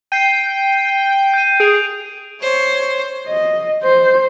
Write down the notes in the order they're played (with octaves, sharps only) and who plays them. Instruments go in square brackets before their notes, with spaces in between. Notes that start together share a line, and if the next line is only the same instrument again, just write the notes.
[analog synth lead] G5 [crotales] C7 D#7
[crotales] G6 D#7
[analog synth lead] G#4 [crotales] D7 F7
[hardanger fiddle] C5 [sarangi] C#5
[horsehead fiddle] D#5
C5